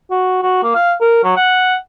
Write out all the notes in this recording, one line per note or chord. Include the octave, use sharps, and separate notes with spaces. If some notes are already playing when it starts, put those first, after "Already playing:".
F#4
F#4
A#3
F5
A#4
F#3
F#5